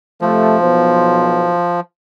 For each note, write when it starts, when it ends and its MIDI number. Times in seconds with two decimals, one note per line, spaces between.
0.21 0.59 48
0.21 1.80 53
0.21 0.59 57
0.60 1.57 35
0.60 1.57 59
0.60 1.57 72